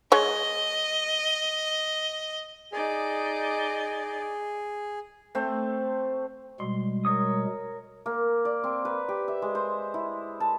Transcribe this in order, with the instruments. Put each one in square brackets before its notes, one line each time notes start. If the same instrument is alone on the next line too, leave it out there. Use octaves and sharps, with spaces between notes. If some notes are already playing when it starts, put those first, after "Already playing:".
[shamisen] G#3 C#5 [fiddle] D#5
[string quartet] D#4 D5 D#5 [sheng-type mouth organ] G#4
[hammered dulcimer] A3 C4 C5
[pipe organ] B2 G3 G#3 [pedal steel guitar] C6
[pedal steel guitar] A#4 C#5 D#6
[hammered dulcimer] A#3
D5
C4
B4
G4
E5
G#3
C5
E4
A5